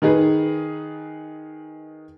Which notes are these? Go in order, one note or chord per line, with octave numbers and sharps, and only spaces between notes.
D#3 D#4 G#4 B4